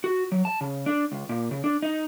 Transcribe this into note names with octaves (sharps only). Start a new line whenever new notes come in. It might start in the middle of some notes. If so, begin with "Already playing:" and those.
F#4
F#3
A5
C#3
D4
C#2
A#2
C#3
D4
D#4